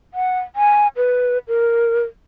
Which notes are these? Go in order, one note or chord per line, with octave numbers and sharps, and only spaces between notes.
F#5
G#5
B4
A#4